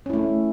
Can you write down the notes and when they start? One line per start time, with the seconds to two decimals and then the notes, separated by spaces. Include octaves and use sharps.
0.06 C#4
0.10 E4
0.13 A3